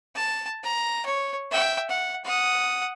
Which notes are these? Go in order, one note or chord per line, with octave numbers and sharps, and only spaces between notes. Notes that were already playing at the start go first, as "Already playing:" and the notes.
A5
A#5
C#5
E5 G5
F#5
F#5 D#6